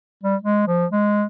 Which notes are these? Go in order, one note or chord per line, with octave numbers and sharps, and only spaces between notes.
G3
G#3
F3
G#3